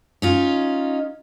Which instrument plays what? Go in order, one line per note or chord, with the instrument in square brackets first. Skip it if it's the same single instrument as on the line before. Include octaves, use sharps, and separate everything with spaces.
[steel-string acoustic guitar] C#4 D#4 F4